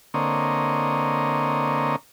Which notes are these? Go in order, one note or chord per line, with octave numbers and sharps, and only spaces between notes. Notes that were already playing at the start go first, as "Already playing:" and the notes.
D3 A#3 C4 C#5 D#5